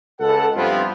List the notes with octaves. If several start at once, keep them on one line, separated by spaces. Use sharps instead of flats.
C#2 A4 F#5
G2 F3 B3 C4 E4 F4